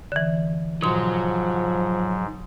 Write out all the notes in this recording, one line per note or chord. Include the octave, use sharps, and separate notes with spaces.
D3 E3
G#2 B2 F3 F#3 C6